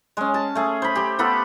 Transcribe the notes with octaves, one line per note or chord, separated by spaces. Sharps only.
G#3 C#4
A5
A3 G#4
C5 B5
G4 C5
B3 F4 A4 B5